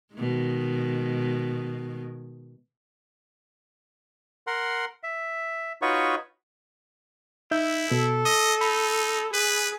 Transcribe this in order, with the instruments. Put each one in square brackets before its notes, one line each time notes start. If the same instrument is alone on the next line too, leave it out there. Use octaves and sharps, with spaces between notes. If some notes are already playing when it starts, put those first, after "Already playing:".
[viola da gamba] B2 D#3 G#3
[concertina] A#4 F#5 C6
E5
D#4 F4 F#4 B4 C#5 C#6
[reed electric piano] D#4 E5 G6 [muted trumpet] E4
[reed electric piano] B2 [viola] A4
[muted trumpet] D#5 [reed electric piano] D#6
[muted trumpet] D#4 [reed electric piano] B5
[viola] G#4 [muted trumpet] B4